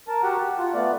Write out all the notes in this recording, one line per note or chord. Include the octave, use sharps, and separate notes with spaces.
A#4 A5
F#4 G4 F#5
F#5
F4
A3 B3 D5